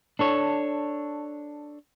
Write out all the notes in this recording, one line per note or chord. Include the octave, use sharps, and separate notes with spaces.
D4 A4 C#5